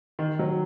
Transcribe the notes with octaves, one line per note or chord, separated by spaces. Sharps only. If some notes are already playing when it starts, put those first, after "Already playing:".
D#3
F#3